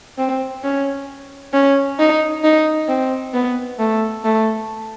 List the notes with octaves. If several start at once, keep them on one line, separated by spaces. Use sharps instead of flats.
C4
C#4
C#4
D#4
D#4
C4
B3
A3
A3